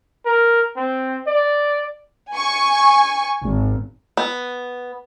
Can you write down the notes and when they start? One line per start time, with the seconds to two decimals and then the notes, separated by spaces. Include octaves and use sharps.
0.26 A#4
0.77 C4
1.27 D5
2.33 G#5 C#6
3.43 G#1
4.17 B3